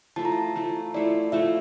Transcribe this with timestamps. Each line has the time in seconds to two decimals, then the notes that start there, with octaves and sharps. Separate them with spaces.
0.16 F3 A3 E4 A5
0.25 A#5
0.32 A5
0.56 F3 A3 E4
0.94 F3 A3 E4 D5
1.32 F3 A3 E4 E5